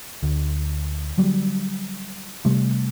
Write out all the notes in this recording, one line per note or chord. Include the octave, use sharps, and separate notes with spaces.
D2
D3 F#3 G3
C3 G3 A3